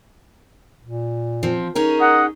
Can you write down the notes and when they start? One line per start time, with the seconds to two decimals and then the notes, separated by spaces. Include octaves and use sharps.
0.83 A#2
1.43 F3 C4
1.75 C#4 D#4 G#4 A#4
2.00 D#5 F#5